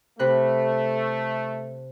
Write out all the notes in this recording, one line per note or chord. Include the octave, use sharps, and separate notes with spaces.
C3 A3 B5 F#6